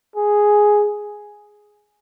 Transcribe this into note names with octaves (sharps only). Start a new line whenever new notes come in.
G#4